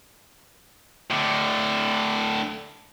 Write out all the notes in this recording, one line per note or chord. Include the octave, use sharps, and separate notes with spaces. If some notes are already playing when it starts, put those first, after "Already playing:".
A2 D3